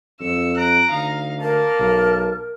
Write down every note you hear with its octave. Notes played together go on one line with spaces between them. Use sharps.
F2 E6 C#7
A#5 F#6 D7
D2 D#4 F5
A#3 A#4 A5
B1